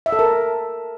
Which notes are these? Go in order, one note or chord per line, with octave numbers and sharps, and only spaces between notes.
E5
A4
A#4